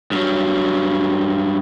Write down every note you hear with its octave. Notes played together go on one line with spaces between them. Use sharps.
G2 F#3